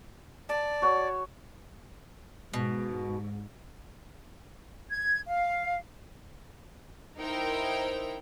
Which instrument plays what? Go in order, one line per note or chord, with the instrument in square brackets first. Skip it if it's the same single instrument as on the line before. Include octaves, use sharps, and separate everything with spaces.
[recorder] D5 [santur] A5
[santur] F#4 C#5
[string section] G#2 [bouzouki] B2
[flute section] G#6
F5
[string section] D#4 E4 A#4 C5 G5